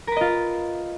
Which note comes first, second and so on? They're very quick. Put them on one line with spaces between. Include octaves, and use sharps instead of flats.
A#4 B4 D#5 F4